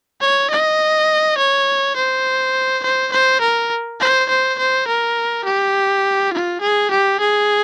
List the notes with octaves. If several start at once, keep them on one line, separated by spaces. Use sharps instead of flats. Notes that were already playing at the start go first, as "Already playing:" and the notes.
C#5
D#5
C#5
C5
C5
C5
A#4
C5
C5
C5
A#4
G4
F4
G#4
G4
G#4